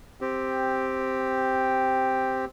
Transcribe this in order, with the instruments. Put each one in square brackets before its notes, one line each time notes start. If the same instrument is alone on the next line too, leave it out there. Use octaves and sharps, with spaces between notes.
[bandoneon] C4 G4